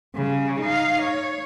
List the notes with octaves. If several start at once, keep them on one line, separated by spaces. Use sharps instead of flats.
C#3 G3
D#4 F5
C#5